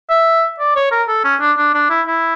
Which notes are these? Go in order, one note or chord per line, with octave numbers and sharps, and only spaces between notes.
E5
D5
C#5
A#4
A4
C#4
D4
D4
D4
E4
E4